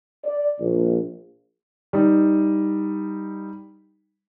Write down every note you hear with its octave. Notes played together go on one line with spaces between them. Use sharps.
D5
A#1
G3 D#4